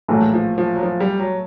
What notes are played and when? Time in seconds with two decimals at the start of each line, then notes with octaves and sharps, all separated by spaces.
0.08 A#1 A2 E3 F#3
0.33 F3
0.58 F3
0.75 F#3
0.83 F3
1.00 G3
1.19 F#3